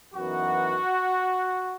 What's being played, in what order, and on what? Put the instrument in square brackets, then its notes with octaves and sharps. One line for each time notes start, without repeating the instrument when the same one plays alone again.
[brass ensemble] F#2 E3 B3 D#4 F#4